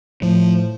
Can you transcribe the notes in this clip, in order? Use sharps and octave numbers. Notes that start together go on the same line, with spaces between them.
A2 F3